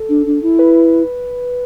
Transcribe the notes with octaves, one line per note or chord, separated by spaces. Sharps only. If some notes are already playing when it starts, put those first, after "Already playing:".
Already playing: A4
D4
D4
E4
B4